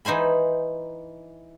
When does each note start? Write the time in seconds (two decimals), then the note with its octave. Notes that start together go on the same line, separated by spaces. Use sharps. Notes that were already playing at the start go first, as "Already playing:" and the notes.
0.05 E3 D#4 C5 G#5 B5